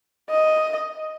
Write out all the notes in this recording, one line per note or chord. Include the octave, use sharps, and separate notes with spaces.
D#5